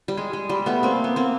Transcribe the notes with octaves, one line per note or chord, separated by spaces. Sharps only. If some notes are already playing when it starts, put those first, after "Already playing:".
G3
G#3
G#3
G3
A3 B3
A#3 C4
B3
A#3 C4